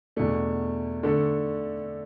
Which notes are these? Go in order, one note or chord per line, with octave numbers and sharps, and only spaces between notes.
E2 B2 A3 D4
D3 A3 D4 A4